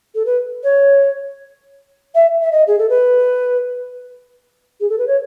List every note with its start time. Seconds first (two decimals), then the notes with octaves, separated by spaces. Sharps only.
0.15 A4
0.25 B4
0.63 C#5
2.15 E5
2.42 E5
2.52 D#5
2.67 G#4
2.78 A4
2.89 B4
4.80 G#4
4.89 A4
4.98 B4
5.07 C#5